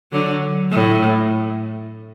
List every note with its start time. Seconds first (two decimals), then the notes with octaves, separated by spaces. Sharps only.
0.12 D3 F#3
0.71 A2